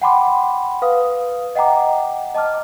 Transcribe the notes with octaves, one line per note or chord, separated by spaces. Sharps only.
F#5 G5 A5 B5 C6 D6
B4 F5 D#6
D#5 F#5 G5 A#5 D6
D#5 A5 D6 F6